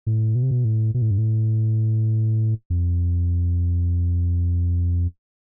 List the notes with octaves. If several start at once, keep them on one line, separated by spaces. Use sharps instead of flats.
A2
B2
C3
B2
A2
B2
A2
G2
A2
F2